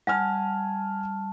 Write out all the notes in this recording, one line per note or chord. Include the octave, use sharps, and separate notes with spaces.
G3 F#5 G#5 A5 F6